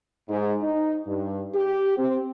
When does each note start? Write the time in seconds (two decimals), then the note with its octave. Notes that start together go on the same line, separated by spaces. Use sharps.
0.28 G#2
0.61 D#4
1.06 G2
1.54 G4
1.97 C4